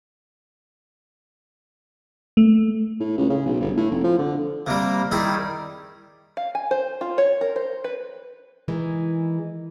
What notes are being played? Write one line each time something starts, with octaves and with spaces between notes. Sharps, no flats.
A3
A2
C#2
C#3
B1
G1
A2
F1
F3
D3
C3 G3 A#3
D#3 G3 E4 G#4
F5
G#5
C5
F4
C#5
A#4
C5
B4
D#3 E3 G#3